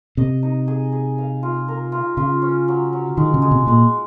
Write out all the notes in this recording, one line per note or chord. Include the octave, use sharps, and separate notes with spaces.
C3 D#5
D#4
G#4
G#4
F5
F4
A#4
F4
C#3 F4
C#4
F#3
F#3
D#3 G#3
C#3
G#3
C3
A#2 G#3